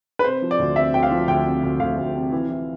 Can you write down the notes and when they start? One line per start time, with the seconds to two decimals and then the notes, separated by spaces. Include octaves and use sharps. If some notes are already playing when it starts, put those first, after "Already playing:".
0.19 B4
0.24 C3 C5
0.42 F3
0.51 D5
0.59 D2
0.76 C3 E5
0.93 D2 G5
1.03 F5
1.11 F3
1.28 D2 G5
1.46 C3
1.63 D2
1.80 D2 F5
1.97 D2
2.15 C3
2.32 E3
2.49 E3